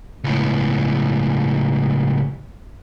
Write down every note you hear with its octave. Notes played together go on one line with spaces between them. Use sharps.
C#2 A2